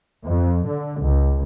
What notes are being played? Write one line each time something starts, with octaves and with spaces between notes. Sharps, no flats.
F2
D3
C#2